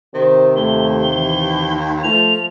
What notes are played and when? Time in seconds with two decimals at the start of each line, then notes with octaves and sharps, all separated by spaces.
0.14 C3 D#3 C5
0.57 D#2 A3 G7
1.12 E3
2.03 F3 A3 F7